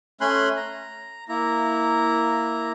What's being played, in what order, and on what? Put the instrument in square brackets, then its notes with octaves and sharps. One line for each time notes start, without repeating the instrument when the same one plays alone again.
[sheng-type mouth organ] A3 C#4 G#5 B5 C6 F#6
A#5
A#3 E4 A#5